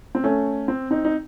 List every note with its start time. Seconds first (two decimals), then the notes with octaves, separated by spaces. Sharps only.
0.15 C4
0.24 A3 C#4
0.68 C4
0.91 C4 D#4
1.05 D#4